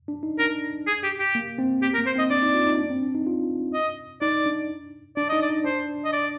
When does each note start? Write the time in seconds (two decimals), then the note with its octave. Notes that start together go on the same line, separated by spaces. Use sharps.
0.08 D4
0.23 D#4
0.39 D4 A#4
0.87 G#4
1.03 G4
1.19 G4
1.35 A#3
1.58 C4
1.82 C4 G4
1.94 A#4
1.98 A#3
2.06 C5
2.15 C4
2.19 D#5
2.30 D4 D5
2.42 D#4
2.54 F4
2.66 D#4
2.79 D4
2.90 C4
3.02 D4
3.15 D#4
3.27 F4
3.74 D#5
4.22 D#4 D5
4.46 D4
5.17 D4 D5
5.29 D#4 D#5
5.43 D5
5.49 D#4
5.64 D4 C5
6.05 D#5
6.13 D5